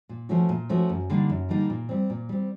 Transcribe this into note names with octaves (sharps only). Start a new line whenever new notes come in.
A#2
F3 A3 C#4 F#4
A#2
F3 A3 C#4 F#4
F#2
D3 G3 A#3 D#4
F#2
D3 G3 A#3 D#4
A#2
G3 C4
A#2
G3 C4